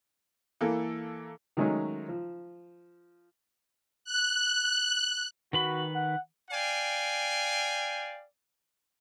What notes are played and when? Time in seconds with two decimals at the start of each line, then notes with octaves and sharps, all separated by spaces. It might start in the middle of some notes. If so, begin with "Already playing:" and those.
0.61 E3 A#3 A4
1.57 D#3 F#3 G#3 A3 C#4 D#4
2.09 F3
4.05 F#6
5.53 D#3 F#4 B4 B5
5.95 F#5
6.51 D5 F5 G5 G#5